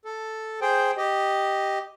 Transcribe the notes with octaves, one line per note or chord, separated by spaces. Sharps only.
A4
G#4 C5 G5
G4 D#5